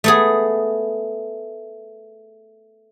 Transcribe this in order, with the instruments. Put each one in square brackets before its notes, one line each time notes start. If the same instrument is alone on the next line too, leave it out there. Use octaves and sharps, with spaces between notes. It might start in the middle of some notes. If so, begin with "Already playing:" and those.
[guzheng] A3 B3 G#4